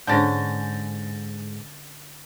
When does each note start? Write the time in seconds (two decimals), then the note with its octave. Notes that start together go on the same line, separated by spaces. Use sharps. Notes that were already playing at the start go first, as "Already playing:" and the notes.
0.07 G#2 D3 C#4 G6 A6 A#6